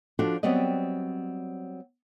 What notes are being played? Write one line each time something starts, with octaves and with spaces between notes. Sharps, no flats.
F3 D4 F#4 A4
F#3 G3 B3 C4 D5 D#5